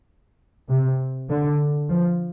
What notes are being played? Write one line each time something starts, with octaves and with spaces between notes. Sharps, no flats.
C3
D3
F3